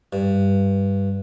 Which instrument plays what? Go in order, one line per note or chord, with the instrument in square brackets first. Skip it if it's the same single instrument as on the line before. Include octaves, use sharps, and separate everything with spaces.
[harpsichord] G2